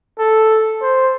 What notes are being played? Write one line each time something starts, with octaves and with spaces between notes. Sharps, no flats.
A4
C5